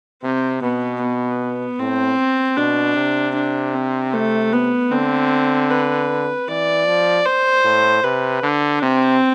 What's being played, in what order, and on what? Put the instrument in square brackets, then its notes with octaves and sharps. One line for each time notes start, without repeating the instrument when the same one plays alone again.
[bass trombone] C3 [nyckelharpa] C4
[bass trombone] B2 [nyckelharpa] B3
[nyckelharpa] B3
[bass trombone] A2 [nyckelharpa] C4
[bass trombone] B2 [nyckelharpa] D4
[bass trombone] C3
[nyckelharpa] D4
C4
A3
B3
[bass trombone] D3 [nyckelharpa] C4
[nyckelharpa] B4
[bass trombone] E3 [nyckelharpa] D5
[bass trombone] F3
[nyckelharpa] C5
[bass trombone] A2
[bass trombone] C3 [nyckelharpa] B4
[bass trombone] D3 [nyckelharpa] D4
[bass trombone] C3 [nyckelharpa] C4